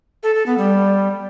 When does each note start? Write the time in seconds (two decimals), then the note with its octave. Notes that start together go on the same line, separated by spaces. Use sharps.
0.23 A4
0.35 A4
0.46 B3
0.58 G3